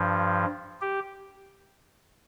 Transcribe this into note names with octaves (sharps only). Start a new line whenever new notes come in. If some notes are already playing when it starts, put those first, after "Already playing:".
Already playing: G2 F3
G4